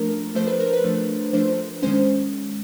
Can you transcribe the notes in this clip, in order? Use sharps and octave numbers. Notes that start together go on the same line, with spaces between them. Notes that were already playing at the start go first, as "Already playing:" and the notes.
Already playing: F3 A3 D4 A#4
F3 A3 D4 C5
B4
A#4
B4
F3 A3 D4
F3 A3 D4 C5
D#3 G#3 C#4 C5